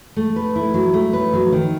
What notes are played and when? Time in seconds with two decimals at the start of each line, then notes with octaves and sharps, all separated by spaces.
0.16 A3
0.36 B4
0.56 E4
0.74 F#3
0.94 A3
1.13 B4
1.34 F#3
1.52 D#3